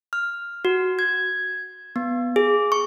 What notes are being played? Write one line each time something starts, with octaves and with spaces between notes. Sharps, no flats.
F6
F#4
G#6
B3
G#4
C#6